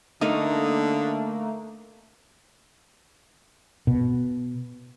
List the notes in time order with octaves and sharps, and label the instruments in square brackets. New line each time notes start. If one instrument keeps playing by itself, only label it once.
[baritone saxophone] D3 [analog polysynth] A3 A#3 [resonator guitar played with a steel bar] D#4 D#5
[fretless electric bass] B2